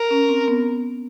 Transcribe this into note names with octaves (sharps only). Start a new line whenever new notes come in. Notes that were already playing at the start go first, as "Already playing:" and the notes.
Already playing: A#4
C#4
C4
B3